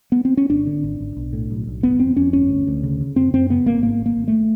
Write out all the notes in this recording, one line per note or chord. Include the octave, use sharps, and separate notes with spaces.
B3
C4
C#4
G#1 D4
D3
G#1
G#1
B1
A2
B1
B1
G1 B3
F2 C4
F2 C#4
G1 C#4
D2
D2
C#3
C#3
F#2 C4
F#2 C4
C#3 B3
G#1 A#3
G#2 A#3
G#1
A#3
G#1
A3